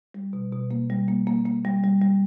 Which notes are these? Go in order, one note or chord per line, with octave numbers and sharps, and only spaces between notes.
G3
B2
B2
A#3
G3
A#3
A#3
A#3
G3
G3
G3